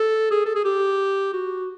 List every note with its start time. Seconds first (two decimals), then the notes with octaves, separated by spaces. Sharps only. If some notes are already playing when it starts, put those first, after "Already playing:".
Already playing: A4
0.31 G#4
0.46 A4
0.55 G#4
0.65 G4
1.33 F#4